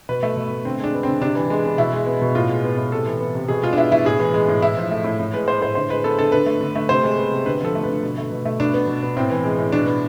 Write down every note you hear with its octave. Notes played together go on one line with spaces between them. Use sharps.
B2 B4
A3
B2
A3
D3 C4
G#3 D4
B3
C4
D3
C3 D4
E3
G#3
B3
B2 E4
G#3
B3
B2
A2 F4
G#3
B3
A2
C3 A4
E3
B3
C3
B2 G#4
G#3 F4
D4
B3 E4
B2 E4
A2 G#4
E3
G#3
A2
A2 E4
F3
A3
A2
A2
G#3 B4
B3 C5
A2 C5
D3 C5
G#3 B4
B3 A4
D3 A4
D3 B4
A3
D3
A3
C3 C5
G#3
B3
C3
D3 B4
F3 A4
A3
B4
D3
B2
A3
B2
A3
B2 D4
B3
B2
B3
A2 C4
E3
G#3
A2
B2 D4
B3